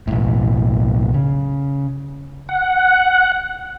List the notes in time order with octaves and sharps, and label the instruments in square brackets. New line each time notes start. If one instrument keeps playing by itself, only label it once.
[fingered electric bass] B1 A2
C#3
[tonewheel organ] F#5